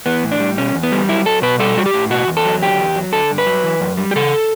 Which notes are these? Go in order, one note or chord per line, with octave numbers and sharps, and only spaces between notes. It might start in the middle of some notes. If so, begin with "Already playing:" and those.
E3 B3
A2
D4
G3
B2 C#4
E2
B3
G3
F#3 E4
F#3 A4
B2 B4
G3 A4
G3 F#4
G4
A2
B2 F#4
E2
A4
F#3
D3 G4
E2
F#3
D3 A4
G2
B4
F#3
E3
F#2
G3
G4
C#3 A4